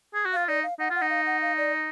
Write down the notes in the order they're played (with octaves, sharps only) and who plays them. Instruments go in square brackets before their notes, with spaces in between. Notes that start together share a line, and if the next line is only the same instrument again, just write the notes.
[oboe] G#4
F#4
[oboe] F4 [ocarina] F5
[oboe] D#4 [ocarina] D5
[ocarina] F5
[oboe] D#4 [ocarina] F#5
[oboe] F4 [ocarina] F#5
[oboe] D#4
[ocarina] F5
F#5
F5
D5